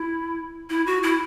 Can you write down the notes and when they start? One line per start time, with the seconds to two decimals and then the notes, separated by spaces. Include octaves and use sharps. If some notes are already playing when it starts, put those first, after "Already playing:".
Already playing: E4
0.70 E4
0.87 F#4
1.03 E4